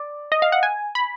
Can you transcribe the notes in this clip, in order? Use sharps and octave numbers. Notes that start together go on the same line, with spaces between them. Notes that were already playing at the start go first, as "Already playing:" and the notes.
Already playing: D5
D#5
F5
F#5
G#5
B5